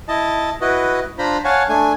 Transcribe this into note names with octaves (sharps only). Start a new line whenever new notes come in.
E4 D#5 A5
E4 F#4 B4 D#5
D4 F4 C5 A#5 B5
C#5 F5 F#5 G#5 A5
A3 D4 G#5